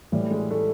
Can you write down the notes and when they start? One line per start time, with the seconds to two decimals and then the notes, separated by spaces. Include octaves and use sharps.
0.12 A2 E3 G3
0.31 G#3
0.51 A3